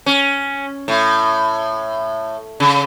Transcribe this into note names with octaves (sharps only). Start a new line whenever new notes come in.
C#4
A2
C#3